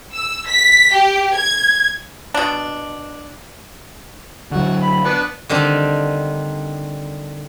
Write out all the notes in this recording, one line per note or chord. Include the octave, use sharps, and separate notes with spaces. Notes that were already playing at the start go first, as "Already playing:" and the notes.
E6
B6
G4
G#6
B2 D4
D3 F#3 F#4
B5
B3 D4 B4
D3 D#3 G3 C4 D4